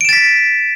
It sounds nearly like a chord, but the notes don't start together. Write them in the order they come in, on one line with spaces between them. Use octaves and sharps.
D7 E7 A6 B6